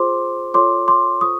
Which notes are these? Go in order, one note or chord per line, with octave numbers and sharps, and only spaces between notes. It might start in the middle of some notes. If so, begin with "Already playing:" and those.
Already playing: F4 G#4 C5 C6 D6
F4 A4 C#5 C6 D6
C6 D6
F4 A4 C5 C#6 D#6